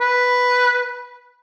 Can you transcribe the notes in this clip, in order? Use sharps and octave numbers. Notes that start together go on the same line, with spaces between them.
B4